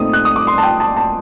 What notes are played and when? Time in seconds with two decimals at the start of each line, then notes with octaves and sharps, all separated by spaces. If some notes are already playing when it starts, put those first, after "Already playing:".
Already playing: A#2 A3 C4 D#4 D#6
0.13 F#6
0.25 D#6
0.36 D6
0.47 C6
0.58 A5
0.63 G5
0.80 A5
0.96 A5